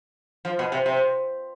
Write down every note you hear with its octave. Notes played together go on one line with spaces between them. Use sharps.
F3
B2
C3
C3